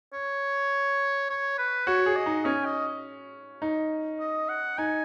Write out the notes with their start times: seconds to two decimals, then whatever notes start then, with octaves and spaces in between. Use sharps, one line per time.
0.13 C#5
1.29 C#5
1.58 B4
1.87 F#4 C#5
2.06 G#4
2.16 D#5
2.26 D#4
2.45 C#4 G#5
2.65 D#5
3.62 D#4
4.19 D#5
4.49 F#5
4.78 D#4 G#5